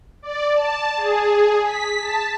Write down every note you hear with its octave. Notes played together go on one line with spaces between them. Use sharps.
D5
A5
G#4
B6
A5